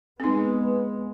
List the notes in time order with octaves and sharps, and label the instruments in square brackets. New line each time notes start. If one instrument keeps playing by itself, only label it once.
[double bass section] G#3 B3 [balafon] C4 D#4